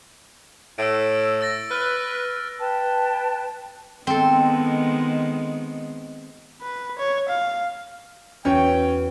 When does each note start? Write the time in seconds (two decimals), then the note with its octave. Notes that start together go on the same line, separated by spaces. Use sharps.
0.78 A2 E6 D7
1.41 E6 A6 A#6
1.71 B4 F6
2.60 B4 G5 A5
4.07 D#3 G#3 B3 C4 A4
6.62 B4
6.99 C#5
7.29 F5
8.45 E2 C#4 F#4 C#5 G5